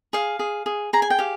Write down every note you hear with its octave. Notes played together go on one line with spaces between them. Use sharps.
G#4 F5
G#4
G#4
G#4 A#5
G#5
G5
G4 F5